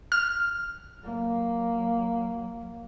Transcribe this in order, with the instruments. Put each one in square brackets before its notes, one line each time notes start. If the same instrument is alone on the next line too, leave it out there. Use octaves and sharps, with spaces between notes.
[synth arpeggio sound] F6
[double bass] F#3 A#3